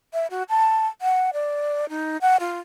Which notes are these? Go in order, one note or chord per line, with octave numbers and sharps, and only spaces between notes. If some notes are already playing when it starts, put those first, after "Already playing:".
E5
F#4
A5
F#5
D5
D#4
F#5
F4